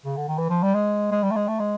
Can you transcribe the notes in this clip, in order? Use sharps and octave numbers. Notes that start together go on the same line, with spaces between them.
C#3
D3
D#3
E3
F3
G3
G#3
G#3
G3
A3
G#3
A3
G#3